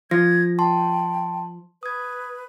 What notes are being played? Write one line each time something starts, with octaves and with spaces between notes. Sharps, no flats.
F3 G#6 A#6
G5 A5 C6
B4 D#6 G#6